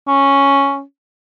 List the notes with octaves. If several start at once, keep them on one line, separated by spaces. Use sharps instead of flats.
C#4